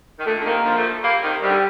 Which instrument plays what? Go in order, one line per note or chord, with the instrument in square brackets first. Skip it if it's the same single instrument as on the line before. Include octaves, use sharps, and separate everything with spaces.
[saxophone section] D#3
[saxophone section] A#2 D3 [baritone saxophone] A3
[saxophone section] D3
[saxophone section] C3 D#3 [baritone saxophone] A#3
[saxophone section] D3 F3
F3 A3
G3 A#3
C3 D#3
[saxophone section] C3 [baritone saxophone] G3
[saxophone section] D3